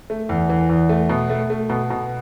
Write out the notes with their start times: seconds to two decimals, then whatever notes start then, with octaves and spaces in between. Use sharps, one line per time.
0.10 A3
0.29 E2
0.50 E3
0.69 E2
0.89 A3
1.09 B2
1.30 A3
1.50 A3
1.69 B2
1.90 B2